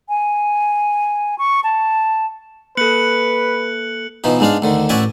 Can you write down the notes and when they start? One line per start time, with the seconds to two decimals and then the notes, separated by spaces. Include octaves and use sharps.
0.09 G#5
1.39 C#6
1.64 A5
2.77 A#3 A4 B4 F#6 C#7 F#7
4.24 B2 E3 F3 D#4
4.40 G#2 G#3 D4 F5
4.62 D2 D3 D#3
4.89 A1 F#4 D5 E5 G5 G#5